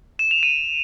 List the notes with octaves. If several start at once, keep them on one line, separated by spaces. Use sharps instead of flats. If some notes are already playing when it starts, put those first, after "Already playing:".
E7
F7
D#7